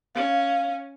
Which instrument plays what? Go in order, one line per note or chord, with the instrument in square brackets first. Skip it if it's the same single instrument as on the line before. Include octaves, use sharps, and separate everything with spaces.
[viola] C#4 [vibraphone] F5